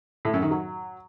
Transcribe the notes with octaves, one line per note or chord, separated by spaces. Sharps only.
A2
F#2
D#3
F#3